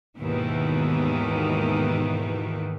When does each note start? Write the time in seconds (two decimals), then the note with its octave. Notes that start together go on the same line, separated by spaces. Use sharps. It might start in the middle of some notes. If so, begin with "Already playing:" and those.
0.17 D#2 G#2 B2 D#3 E3 B3